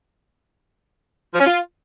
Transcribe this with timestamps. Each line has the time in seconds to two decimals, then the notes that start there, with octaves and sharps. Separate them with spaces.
1.33 F3
1.39 C#4
1.45 F4